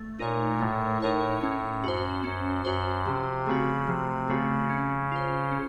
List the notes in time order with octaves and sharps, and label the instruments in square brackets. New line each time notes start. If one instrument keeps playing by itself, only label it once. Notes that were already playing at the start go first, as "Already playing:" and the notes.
Already playing: [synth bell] A3
[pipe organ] A#2 [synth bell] D#4 A#4 C#5
[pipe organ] A2 [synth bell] A3
[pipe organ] A2 [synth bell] D#4 A#4 C#5
[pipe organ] A2 [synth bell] C#4
[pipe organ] F#2 [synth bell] F#4 C5
[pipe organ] F#2 [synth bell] C#4
[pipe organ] F#2 [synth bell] F#4 C5
[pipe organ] C3 [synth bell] F3
[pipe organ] C#3 [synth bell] A3 C4 F#4
[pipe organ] C3 [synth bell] F3
[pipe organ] C#3 [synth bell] A3 C4 F#4
[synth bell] C#4
F4 C5
C#4